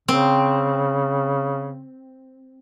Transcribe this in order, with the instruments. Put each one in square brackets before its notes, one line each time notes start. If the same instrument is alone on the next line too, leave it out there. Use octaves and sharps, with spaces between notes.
[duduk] C#3 [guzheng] C4